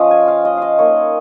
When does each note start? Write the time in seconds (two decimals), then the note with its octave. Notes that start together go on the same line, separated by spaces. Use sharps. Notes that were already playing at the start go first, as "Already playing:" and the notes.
Already playing: F3 C#4 F4 D#5 F5
0.11 G#5
0.28 F5
0.45 D#5
0.57 D#5 F5
0.79 A#3 D#4 C#5